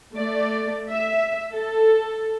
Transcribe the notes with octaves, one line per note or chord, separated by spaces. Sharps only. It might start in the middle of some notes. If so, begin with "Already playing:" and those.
A3 D5
E5
A4